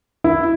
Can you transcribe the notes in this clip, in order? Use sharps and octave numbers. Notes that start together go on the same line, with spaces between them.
E4